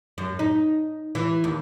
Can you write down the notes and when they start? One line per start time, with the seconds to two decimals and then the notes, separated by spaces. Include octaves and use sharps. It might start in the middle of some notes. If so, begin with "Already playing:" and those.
0.18 F#2
0.39 D#4
1.15 E3
1.44 D#2